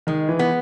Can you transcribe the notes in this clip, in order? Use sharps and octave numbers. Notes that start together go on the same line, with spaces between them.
D#3 G#3
E3
B3